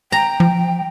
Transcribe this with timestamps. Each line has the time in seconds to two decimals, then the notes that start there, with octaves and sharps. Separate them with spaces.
0.12 G5 A#5
0.40 F3